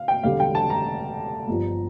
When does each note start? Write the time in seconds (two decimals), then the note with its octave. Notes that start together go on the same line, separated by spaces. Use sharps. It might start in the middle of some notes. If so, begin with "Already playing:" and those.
Already playing: F5
0.08 G5
0.23 E1 E2 D3 G3 F5
0.40 G5
0.55 A5
0.70 A#5
1.47 G1 G2 F3